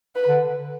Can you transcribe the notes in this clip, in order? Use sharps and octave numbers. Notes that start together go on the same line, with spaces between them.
B4
D3